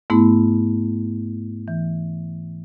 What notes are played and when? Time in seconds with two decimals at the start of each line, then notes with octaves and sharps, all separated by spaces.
0.10 G#2 A3 B3 E4
1.68 E3